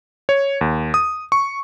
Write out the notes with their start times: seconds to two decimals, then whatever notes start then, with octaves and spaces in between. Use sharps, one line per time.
0.29 C#5
0.61 D#2
0.94 D#6
1.32 C#6